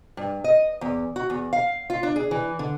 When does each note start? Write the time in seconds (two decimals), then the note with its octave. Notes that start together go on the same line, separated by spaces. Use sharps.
0.17 G2
0.44 D#5
0.81 E2
1.16 F#4
1.30 E2
1.53 F5
1.90 F4
2.03 D4
2.16 G#4
2.31 E3
2.59 D3